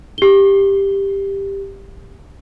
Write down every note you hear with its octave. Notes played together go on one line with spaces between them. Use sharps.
G4 G7